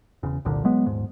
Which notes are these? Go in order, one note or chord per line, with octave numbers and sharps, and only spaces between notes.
E1 C#3
F1 C2 A#2 D3
F#3 G#3 B3
D#1 G#2